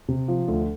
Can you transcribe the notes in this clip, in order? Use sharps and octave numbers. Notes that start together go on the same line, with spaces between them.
C3
F3
D2